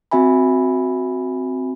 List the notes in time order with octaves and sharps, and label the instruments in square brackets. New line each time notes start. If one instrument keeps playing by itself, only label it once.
[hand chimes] C4 F#4 E5 G#5 B5